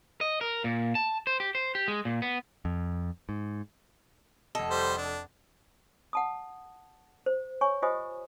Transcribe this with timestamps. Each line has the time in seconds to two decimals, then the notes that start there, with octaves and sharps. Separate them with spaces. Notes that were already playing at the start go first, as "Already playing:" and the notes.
0.21 D#5
0.41 A#4
0.64 A#2
0.95 A5
1.27 C5
1.40 G4
1.55 C5
1.75 G4
1.88 G#3
2.05 A#2
2.22 B3
2.65 F2
3.29 G#2
4.55 F1 A4 D#5
4.70 G3 C5
4.98 D4
6.13 F#5 A5 D#6
7.26 C5
7.61 C#5 G#5 C#6
7.82 F4 G4 C5 D#5 G#5 D#6